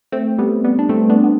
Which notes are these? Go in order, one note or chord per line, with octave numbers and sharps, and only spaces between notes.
A3 C4
G3 B3
G3 B3
D4
A3 C4
B3 D4
B3